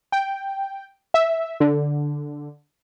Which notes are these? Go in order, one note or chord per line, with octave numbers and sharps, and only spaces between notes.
G5
E5
D3